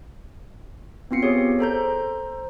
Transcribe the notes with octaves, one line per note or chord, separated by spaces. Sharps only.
B3 C4 F4 C7 C#7
B3 G4 G#4 C#5
A4 C5 A#5 G6